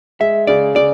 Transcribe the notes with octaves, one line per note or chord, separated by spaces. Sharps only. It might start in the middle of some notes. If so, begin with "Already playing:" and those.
G#3 E5
C#3 D5
C#3 D5